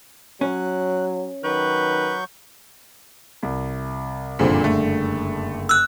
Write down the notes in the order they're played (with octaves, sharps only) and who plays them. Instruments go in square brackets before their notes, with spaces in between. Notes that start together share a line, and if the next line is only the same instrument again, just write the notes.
[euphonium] F#3 [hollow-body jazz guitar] C#4 [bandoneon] F#6
[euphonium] D#3 [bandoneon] F#3 C#6 G6 [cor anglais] B4
[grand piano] C2
[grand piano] F#1 G2 D3 [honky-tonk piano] A#2 F3 C4
[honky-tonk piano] A3
[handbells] E6 F#6